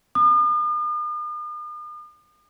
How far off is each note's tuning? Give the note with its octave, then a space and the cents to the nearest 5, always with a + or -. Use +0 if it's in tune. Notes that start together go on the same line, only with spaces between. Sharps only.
D#6 -45